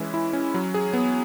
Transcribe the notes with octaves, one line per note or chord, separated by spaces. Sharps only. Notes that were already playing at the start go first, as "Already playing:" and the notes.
Already playing: E3 G#3 C#4 E4
E4
C#4
F#3
G#4
B3